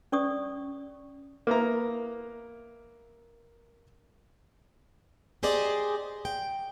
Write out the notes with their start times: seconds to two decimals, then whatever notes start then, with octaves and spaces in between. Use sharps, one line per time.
0.12 C#4 D5 C#6 D#6
1.47 A#3 B3 E4 A#5
5.43 G4 G#4 C5 D5 D#5
6.25 G5